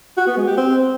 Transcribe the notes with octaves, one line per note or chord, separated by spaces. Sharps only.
F#4
B3
G#3
G4
C4